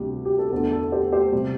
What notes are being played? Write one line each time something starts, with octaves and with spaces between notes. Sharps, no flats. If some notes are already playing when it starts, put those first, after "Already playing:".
Already playing: D2 C3 G3 G4
G4
A4
E2 D3 A3 A4
A4
G4 C5
G4 C5
C3 G3